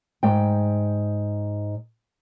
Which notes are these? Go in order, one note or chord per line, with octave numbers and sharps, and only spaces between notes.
G#2 G5